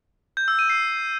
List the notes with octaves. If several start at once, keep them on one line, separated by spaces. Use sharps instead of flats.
G6
E6
D#7
C7